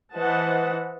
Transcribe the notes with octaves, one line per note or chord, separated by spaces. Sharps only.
E3 B4 C5 D#5 F#5 A5